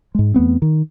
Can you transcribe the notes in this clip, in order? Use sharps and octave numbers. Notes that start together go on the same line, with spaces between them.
G#2 G#3
E2 A3 B3 C4
D#3